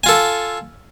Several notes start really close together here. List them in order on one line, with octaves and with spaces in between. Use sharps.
G#5 F4 A4